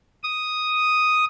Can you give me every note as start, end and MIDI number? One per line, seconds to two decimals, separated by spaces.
0.24 1.25 87